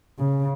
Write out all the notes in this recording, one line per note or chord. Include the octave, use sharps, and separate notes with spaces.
C#3